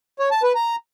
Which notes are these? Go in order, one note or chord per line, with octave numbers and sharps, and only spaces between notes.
C#5
A5
B4
A#5